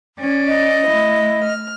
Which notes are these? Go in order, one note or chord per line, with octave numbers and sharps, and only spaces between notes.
C#4 D5
D#5
A3 E4
F6